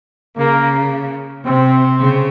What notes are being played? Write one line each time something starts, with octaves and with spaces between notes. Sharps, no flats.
C#3 A#3
C3 C4
C#3